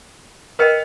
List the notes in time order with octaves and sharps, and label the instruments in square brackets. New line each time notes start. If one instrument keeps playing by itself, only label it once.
[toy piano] A#4 D#5 G5 [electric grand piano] B4 F6 C#7